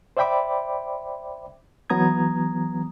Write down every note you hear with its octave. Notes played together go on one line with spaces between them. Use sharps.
C5 D5 E5 G5 B5 D6
E3 F#3 B3 A#5 D#6 G#6